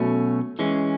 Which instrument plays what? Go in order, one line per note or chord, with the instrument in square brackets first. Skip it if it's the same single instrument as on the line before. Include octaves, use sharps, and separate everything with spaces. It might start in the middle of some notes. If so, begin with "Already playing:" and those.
Already playing: [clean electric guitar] B2 F#3 A3 C#4
E3 G#3 C#4